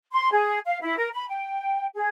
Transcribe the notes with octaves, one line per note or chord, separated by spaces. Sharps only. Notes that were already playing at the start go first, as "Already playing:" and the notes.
C6
G#4
F5
E4
A#4
B5
G5
G#4